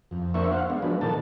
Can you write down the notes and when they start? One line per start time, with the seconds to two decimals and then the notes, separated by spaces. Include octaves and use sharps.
0.11 F2
0.34 F2 A#3 D4 C5 E5 C#6
0.51 C5 F5 F#5
0.70 G#3 B3 D4
0.82 F3 F#3 G#3 D4 B4
1.01 A#2 D#3 A4 A5